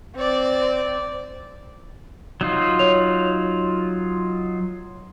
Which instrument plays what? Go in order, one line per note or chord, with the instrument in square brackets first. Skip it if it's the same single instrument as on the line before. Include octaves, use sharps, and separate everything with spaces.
[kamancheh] C4 D5
[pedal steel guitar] F#3 D#4 F4
[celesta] C#5 F7